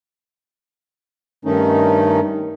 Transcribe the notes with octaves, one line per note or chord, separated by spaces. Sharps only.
G2 D#3 A3 C#4 D#4